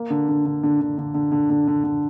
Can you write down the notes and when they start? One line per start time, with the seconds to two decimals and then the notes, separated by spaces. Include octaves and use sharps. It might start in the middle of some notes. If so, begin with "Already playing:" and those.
Already playing: A#3
0.10 D3
0.29 D3
0.46 D3
0.63 D3
0.81 D3
0.98 D3
1.14 D3
1.32 D3
1.50 D3
1.68 D3
1.84 D3